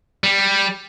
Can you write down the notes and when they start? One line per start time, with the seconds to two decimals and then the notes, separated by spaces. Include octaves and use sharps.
0.23 G3